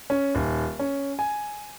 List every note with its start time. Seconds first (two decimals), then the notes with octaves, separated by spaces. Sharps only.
0.10 C#4
0.35 D#1
0.79 C#4
1.19 G#5